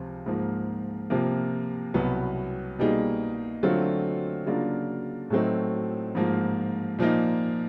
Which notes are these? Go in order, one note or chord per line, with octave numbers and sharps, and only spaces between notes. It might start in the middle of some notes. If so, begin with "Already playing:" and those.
Already playing: C#2 C3 F3
G#2 F3 A#3
C3 F3 A#3
C2 B2 F#3 B3
B2 G3 A#3 D#4 G#4
D3 F#3 A3 C4 F4
C#3 F#3 A#3 D4 F4
A2 F#3 A3 C4 D#4
G#2 F3 A#3
A#2 F3 A#3 D#4